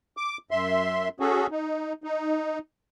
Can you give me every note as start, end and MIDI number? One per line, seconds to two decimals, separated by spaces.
0.17 0.38 86
0.51 1.08 42
0.51 1.08 76
0.51 1.08 84
1.20 1.47 61
1.20 1.47 66
1.20 1.47 68
1.20 1.47 69
1.51 1.93 63
2.04 2.59 63